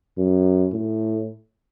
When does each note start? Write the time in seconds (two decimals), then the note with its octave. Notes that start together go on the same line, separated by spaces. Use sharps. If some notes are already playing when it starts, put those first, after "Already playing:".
0.18 F#2
0.73 A2